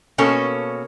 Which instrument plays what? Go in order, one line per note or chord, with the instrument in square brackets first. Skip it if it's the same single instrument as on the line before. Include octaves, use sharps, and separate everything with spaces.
[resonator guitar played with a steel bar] B2 A#3 C#4 A4